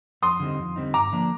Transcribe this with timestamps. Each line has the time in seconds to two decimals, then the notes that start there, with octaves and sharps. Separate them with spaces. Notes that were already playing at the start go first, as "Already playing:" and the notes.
0.22 F2 C6 D#6
0.40 D3 G3 C4 D#4
0.58 F2
0.76 D3 G3 C4 D#4
0.94 G2 A#5 D6
1.12 D3 F3 A#3 D4